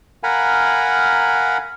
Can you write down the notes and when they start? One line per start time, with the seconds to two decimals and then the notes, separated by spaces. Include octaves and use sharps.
0.23 A#4 F5 F#5 G#5 A#5 B5